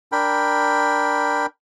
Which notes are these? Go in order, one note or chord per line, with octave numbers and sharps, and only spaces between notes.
D4 A#4 G5 B5